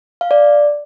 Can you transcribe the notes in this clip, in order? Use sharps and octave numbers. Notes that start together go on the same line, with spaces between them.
F5
D5